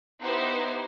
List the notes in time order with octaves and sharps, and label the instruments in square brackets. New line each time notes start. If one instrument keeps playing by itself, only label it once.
[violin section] B3 D#4 E4 G4 C5